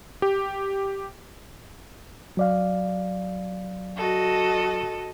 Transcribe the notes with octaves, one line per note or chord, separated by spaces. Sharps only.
G4
F#3 D5 F5
F#4 A4 D#5